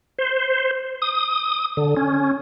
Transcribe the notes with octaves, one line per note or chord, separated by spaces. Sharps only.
C5
D#6
D3
C#4